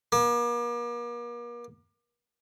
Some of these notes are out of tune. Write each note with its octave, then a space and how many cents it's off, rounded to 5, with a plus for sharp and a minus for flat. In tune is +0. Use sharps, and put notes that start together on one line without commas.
A#3 +40